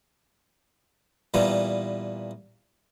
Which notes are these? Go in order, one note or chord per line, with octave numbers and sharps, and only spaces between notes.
A#2 E3 G3 B3